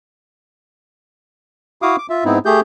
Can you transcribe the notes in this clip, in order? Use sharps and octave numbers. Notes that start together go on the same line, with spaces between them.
E4 F#4 F5 D6 D#6
D6
F4 E5
G#2 B3 C4 D#4 E4
A3 G4 G#4 G6